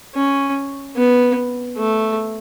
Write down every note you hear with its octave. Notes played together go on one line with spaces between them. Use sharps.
C#4
B3
A3